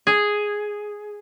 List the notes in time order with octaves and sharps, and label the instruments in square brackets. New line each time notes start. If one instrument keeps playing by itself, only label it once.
[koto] G#4